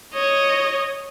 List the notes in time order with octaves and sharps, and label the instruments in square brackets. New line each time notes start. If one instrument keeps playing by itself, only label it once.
[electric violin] C#5 D#5